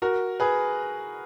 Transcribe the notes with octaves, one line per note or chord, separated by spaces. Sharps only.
F#4 A#4
G#4 B4